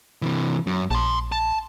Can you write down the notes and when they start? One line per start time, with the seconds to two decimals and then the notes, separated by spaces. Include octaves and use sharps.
0.22 C3 E3
0.67 F#2
0.91 A#1 A5 C6
1.32 A5